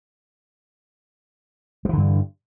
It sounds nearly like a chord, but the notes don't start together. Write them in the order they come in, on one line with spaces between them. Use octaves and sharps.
G3 E3 D3 G2